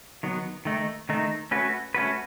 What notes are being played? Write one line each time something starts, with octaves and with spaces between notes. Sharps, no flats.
D#3 F#3 B3
D#3 A3 D#4
D#3 A3 D#4
A3 C#4 F#4 B4
A3 C#4 F#4 B4